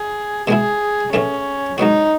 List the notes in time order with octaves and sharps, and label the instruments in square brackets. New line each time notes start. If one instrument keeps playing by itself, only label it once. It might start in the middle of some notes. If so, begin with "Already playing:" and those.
Already playing: [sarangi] G#4
[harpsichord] B2 G#3 B3 E4 [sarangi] G#4
[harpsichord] A1 A2 E3 A3 [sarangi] C#4
[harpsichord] G#2 F#3 B3 F#4 [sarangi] D#4